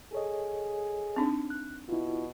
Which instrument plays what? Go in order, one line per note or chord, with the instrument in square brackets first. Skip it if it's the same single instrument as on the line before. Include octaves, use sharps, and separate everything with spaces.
[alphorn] G#4 [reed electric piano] A4 C#5 D#5
[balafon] C4 D4 D#4
[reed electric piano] F#6
[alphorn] B2 [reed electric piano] E4 F4